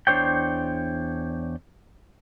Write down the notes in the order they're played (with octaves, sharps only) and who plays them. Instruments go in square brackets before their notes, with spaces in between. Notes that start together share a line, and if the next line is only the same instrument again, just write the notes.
[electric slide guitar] E2 D4 C5 C#5 G5